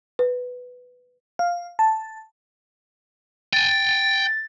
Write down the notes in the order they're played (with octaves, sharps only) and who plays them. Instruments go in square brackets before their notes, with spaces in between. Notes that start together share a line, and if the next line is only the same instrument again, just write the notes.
[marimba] B4
[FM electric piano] F5
A5
[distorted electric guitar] G5 G#5 [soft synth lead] A6